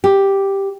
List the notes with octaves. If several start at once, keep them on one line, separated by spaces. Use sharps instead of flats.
G4